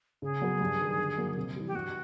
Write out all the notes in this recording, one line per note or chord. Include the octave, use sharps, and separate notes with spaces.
C#3 G#4
F#3 B3
G2
D#3 G3
D3
F#3 A#3
C3
E3 G3
G4
G2 F#4